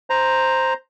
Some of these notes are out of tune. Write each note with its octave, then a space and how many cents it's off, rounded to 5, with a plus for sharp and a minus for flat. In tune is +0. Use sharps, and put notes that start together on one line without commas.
C5 +0 A#5 +0